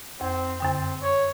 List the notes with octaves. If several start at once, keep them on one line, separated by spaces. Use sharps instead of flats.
F2 C4
F#2 D3 C4 G5
C#5